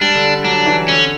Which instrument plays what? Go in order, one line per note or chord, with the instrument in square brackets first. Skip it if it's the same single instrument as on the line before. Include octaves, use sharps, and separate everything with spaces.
[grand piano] G3 [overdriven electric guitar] D4
[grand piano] D3
[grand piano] F#3 [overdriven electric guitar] D4
[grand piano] E3
[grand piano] D3 [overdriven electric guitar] C#4